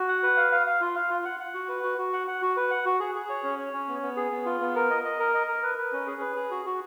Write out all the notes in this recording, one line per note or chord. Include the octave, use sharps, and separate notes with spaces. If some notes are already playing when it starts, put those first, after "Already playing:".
Already playing: F#4
F#5
B4
F5
F5
F5
F4
F5
F4
F#5
F#5
F#4
B4
F#4
F#4
F#5
F#5
F#4
B4
F#5
F#4
G#4
G#4
C#5
C#4
C#5
C#4
B3
B3
G#4
B3
F4
B3
A#4
D#5
D#5
A#4
D#5
A#4
B4
B4
C#4
G#4
B4
G#4
F#4
F#4